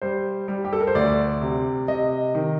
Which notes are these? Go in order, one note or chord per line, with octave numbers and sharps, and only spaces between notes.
G3 C5
G3
G4
A4
A#4
C5
D2 D5
C3
C3 D#5
D#3